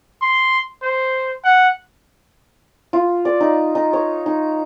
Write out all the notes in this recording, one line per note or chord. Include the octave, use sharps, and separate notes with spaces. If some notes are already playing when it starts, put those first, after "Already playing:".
C6
C5
F#5
F4
D5
D#4
D#4
C#5
D#4